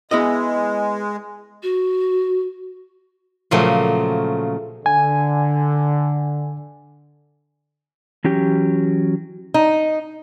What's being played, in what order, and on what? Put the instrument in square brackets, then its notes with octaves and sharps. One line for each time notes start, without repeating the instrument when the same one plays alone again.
[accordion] G#3 [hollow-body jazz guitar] B3 E4 D#5
[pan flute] F#4
[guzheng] A#2 C#3 F3 F#3 A3
[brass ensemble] D3 [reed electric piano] G#5
[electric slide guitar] E3 F#3 C#4 G4
[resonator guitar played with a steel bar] D#4